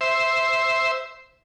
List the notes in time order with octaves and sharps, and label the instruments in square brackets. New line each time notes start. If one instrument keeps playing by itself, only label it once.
[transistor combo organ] C5 E5